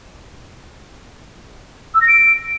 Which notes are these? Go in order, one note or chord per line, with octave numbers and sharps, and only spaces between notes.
E6
A#6
D7